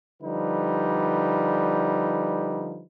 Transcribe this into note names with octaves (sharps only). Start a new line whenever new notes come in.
D3 F3 G3 D#4 B4